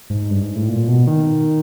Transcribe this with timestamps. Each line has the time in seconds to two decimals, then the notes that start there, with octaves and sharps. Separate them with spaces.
0.10 G#2
0.30 G2
0.42 G#2
0.56 A2
0.69 A#2
0.88 B2
1.07 D#3